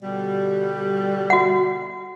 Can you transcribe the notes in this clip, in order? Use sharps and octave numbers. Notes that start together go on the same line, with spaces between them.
B2 D3 G3
F#4 F#5